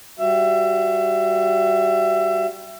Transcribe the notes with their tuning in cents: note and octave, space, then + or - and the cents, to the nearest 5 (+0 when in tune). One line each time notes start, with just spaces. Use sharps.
G3 +0 F#4 +0 E5 +25